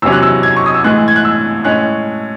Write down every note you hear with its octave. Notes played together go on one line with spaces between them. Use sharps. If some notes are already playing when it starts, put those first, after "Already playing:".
E2 C3 F#3 C#4 E6
F#6
E6
G#6
C#6
D#6
E6
A2 E3 G#3 F#6
G#6
F#6
E6
A2 G#3 C#4 F#6